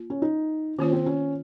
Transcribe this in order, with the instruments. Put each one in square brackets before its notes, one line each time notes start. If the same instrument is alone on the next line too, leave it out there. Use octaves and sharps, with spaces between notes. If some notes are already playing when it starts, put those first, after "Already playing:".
Already playing: [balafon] A#3 F4
[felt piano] C#4
D#4
[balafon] D#3 A#3 F4 C5 [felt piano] C#4
[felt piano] C4
C#4